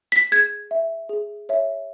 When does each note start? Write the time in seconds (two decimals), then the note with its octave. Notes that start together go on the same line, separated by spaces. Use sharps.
0.12 B6
0.32 G#4 G#6
0.71 E5
1.09 G#4
1.49 C#5 E5